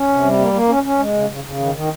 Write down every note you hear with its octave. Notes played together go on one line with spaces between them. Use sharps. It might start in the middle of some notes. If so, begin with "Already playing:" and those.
Already playing: C#4
C3
G3
A#3
A#3
C#4
C#4
G#3
C#3
C#3
C#3
D#3
D#3